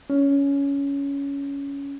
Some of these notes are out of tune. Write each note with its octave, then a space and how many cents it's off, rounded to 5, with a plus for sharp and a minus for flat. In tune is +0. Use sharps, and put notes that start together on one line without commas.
C#4 +15